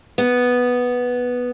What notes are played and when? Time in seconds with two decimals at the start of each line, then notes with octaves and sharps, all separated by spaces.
0.18 B3